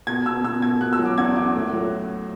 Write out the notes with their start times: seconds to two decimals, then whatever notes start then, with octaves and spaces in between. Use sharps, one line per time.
0.07 B2 G#6
0.25 B2 E6
0.44 B2 E6
0.62 B2 G#6
0.80 B2 F#6
0.93 E6
0.99 F#3
1.05 D6
1.18 E2 G#6
1.36 E2 D6
1.55 A2
1.73 F#3